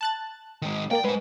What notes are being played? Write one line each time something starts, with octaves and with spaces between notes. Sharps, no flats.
A5 F#6 A6
D#3 G#3
A#3 A#4 D5 G5
G#3 B4 C5